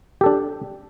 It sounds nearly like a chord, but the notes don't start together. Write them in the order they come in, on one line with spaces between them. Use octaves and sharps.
G4 A4 D4